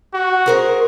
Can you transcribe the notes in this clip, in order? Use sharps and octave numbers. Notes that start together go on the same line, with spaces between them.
F#4
G#4 A#4 C5